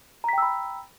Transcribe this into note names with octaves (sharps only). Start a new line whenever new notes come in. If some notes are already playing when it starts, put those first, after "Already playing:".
G5 A#5 B5 E6 B6